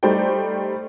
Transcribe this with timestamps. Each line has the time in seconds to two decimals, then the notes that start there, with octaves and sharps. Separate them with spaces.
0.03 G3 A3 D#4 C5 D5 G5